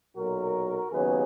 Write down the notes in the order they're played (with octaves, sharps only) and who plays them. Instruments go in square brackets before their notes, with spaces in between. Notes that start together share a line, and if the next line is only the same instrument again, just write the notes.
[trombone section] B1 A#2 F#3 F#4 A#4
D#2 C#3 F#3 B3 G#4 B4